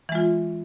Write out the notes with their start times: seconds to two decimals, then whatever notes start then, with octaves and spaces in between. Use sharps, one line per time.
0.09 E3
0.12 G#3
0.15 F4